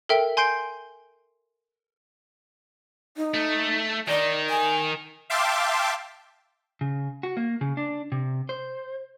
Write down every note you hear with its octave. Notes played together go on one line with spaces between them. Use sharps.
A4 A#4 E5 G5
G#5 C6 G6 C7 D7 G7
D#4
A3
D#3 D5
G#5
E5 F5 G5 A5 C6 D6
C#3
F#4
A#3
C#3
D4
C3
C5